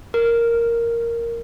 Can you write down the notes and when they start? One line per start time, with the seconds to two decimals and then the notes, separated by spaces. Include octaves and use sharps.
0.14 A#4